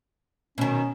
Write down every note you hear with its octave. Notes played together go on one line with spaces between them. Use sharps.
B2 D#3 C#4